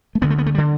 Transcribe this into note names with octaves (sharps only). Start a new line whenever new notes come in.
A3
D2 D3 B3
A3
B3
A3
G3
D3